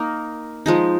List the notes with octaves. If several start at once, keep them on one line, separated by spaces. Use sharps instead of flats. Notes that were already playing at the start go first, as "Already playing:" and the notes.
Already playing: A#3 D#4 A#4
F3 G#3 D#4